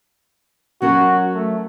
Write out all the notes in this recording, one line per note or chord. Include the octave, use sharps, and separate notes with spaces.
F#3 C#4 F#4 A#4
A3